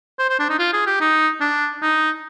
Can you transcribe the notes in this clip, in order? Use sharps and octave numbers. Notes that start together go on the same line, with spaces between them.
C5
C5
D4
D#4
F4
G#4
G4
D#4
D4
D#4